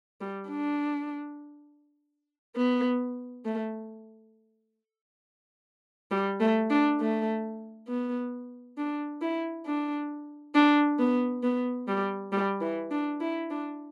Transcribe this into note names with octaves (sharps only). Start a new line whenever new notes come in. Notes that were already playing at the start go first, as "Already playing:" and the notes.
G3
D4
B3
A3
G3
A3
D4
A3
B3
D4
E4
D4
D4
B3
B3
G3
G3
E3
D4
E4
D4